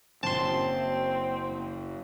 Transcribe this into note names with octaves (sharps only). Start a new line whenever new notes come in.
F#1 C4 A5 C6